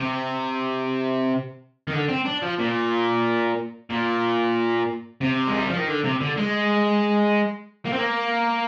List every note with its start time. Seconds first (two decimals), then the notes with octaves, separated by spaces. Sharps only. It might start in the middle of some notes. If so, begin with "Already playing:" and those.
Already playing: C3
1.88 D#3
1.93 D3
2.09 C4
2.25 D4
2.42 F3
2.59 A#2
3.90 A#2
5.21 C3
5.47 G#3
5.57 G3
5.68 F3
5.77 D#3
5.88 D3
6.04 C3
6.21 D3
6.37 G#3
7.86 A#3
7.93 C4
7.99 A#3